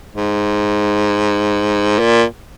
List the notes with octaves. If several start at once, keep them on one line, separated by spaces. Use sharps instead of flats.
G#2
A#2